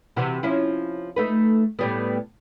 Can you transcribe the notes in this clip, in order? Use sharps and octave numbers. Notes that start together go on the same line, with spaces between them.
C3 E3 F#4
F3 C#4 E4
A3 D#4 B4
A2 G3 B3